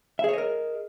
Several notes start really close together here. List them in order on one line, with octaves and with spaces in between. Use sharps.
E5 G#4 C#5 D#5 A#4